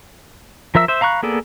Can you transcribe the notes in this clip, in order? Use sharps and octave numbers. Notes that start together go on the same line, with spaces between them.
F3 A#4 E5 E6
C5 E5
F5 A#5 B5 C#6 F#6
A#3 B3 G#4 A4 D5